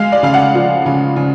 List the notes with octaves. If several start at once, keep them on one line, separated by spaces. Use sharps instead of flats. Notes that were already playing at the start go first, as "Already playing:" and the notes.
Already playing: G#3 F5
D5
C#3 F5
F#5
F3
C#3
C#3